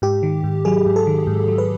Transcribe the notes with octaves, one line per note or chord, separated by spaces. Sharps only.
G#2 G4
D#3
G#2
F#3 G#4
G#2
A4
D#3
G#2
F#3
B4